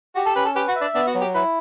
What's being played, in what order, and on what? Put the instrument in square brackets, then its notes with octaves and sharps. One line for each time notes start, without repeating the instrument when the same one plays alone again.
[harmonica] F#4 [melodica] G4
[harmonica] A4
[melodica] C#4 [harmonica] B4
[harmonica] A4
[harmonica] G4 [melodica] B4
[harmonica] F#4
[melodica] E5
[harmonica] D4
[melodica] B3 [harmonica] D4
[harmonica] F#4
[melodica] F#3
[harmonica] G4
[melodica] E4 [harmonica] B4